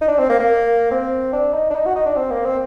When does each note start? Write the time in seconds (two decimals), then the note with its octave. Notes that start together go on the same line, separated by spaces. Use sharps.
0.01 D#4
0.08 D4
0.19 C4
0.30 A#3
0.40 A#3
0.91 C4
1.33 D4
1.54 D#4
1.71 D4
1.75 D#4
1.86 F#4
1.96 D#4
2.06 D4
2.17 C4
2.31 A#3
2.45 C4